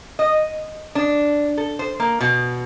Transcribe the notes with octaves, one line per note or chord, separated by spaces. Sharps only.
D#5
D4
A4
C5
A#3
B2